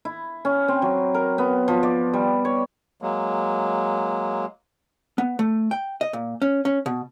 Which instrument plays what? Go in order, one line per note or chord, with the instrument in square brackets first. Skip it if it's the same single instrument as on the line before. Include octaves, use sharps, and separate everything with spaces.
[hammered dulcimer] E4
C#4
C4
F#3
A#4
B3
F3
D5
G3
C#5
[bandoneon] F#3 G#3 A#3
[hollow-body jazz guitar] B3
A3
G5
D#5
A#2
C#4
C#4
B2